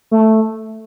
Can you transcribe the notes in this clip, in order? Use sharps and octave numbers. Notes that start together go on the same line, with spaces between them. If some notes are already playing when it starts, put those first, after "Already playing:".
A3